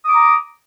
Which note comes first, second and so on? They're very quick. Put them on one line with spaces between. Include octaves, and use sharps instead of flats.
D#6 D6 A#5